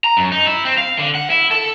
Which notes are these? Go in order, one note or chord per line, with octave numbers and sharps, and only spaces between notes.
A#5
F#2
D#4
E4
C4
F5
D3
F#5
E4
A4